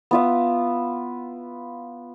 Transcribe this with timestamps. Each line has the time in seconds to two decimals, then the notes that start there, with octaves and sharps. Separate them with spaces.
0.11 B3 F4 E5